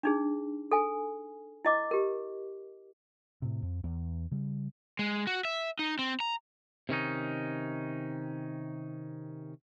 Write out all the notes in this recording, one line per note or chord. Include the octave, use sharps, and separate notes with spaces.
D4 D#4 G#4
A4 G#5
E4 D#5 D6
G4 A#4
A2 C3
F2
E2
C#3 G3
G#3
F#4
E5
D#4
C4
A#5
C3 D#3 C#4 D#4